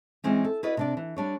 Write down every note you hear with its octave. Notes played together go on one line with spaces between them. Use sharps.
E3 G#3 C4 C#4
A4
E4 F#4 A#4 B4 D5 D#5
C3 D4 D5
E3
G3 D4 C#5